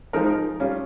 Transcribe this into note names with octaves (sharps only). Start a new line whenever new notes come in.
F3 G#3 D#4 A#4
G3 C#4 F4